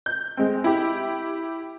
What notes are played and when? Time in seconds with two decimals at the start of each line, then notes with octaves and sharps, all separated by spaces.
0.06 G6
0.37 G#3 C4
0.64 E4 G4